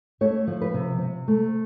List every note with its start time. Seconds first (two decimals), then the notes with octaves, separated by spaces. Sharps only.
0.21 A3 C#5
0.47 F3
0.61 B4
0.74 C3
1.01 C3
1.28 A3